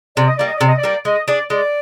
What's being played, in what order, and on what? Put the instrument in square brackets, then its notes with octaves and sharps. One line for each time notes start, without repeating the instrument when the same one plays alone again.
[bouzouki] C3 [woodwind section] D5
[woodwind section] D#5
[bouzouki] G3 A#3 [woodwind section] D5
[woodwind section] D#5
[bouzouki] C3 [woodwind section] D5
[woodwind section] D#5
D5
[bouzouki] G3 A#3
[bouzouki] G#3 [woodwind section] D#5
[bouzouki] D4 G#4 [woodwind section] D5
[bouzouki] G#3 [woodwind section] D5